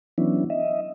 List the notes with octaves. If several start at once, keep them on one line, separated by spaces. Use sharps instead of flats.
E3 F#3 B3 C#4 D4 E4
D#5 E5